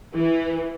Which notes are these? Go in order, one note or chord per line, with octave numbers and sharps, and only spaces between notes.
E3